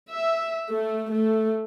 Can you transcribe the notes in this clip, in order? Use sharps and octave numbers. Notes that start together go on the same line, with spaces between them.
E5
A3
A3